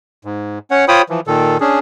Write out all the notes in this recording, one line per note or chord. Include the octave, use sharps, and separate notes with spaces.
G#2
C#4 C#5 F#5
F4 C5 C#5 G5 B5 D#6
E3 F3
A#2 D#3 A4
C#4 D4 G#4